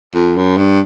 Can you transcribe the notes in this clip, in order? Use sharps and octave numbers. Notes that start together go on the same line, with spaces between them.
F2
F#2
G2